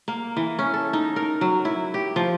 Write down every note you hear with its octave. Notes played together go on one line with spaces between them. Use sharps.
A#3
E3
C#4
A4
D#4
A#4
F#3
E4
G4
F3